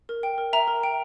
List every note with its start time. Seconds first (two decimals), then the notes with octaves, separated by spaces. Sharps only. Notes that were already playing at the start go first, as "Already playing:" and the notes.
0.09 A#4
0.23 G5
0.38 A#4
0.53 E5 A#5
0.68 A#4
0.83 G5